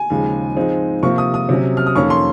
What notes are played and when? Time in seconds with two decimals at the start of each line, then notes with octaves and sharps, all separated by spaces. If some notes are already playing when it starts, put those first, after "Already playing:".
Already playing: G#5
0.10 D#2 C#3 F3 G#3
0.56 G#2 F3 G#3 C4 D#4
1.03 C3 F3 A#3 C#6
1.18 D#6
1.34 D#6
1.49 C3 F#3 C#4
1.77 F6
1.86 D#6
1.95 F2 D#3 A#3 C#4 C#6
2.10 C6